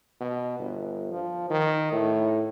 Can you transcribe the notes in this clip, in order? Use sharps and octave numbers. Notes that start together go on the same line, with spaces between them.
B2
G1
F3
D#3
A2